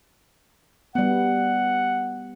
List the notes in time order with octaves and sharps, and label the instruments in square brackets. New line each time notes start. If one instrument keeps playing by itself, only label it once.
[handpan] G3 B3 [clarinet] F#5